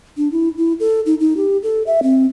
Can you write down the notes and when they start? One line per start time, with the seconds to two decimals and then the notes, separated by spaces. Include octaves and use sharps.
0.17 D4
0.32 E4
0.58 E4
0.80 A4
1.06 D#4
1.20 D#4
1.37 G4
1.63 A4
1.87 E5
2.03 C4